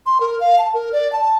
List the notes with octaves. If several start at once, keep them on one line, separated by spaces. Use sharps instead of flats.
C6
A#4
F5
A5
A#4
D5
A5